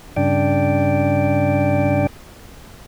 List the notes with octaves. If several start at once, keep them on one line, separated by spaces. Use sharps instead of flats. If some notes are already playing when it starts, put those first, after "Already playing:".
G2 C#3 D4 D5 G5